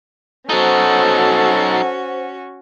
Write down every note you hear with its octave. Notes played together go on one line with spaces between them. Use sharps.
F#3 C#4 D#4 F#4 A4 C5 F#5